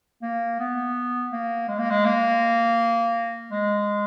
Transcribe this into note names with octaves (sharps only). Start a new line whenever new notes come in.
A#3
B3
A#3
G#3
A#3
G#3
A#3
G#3